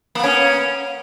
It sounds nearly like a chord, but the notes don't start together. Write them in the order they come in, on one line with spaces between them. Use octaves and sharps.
A#3 B3 C#4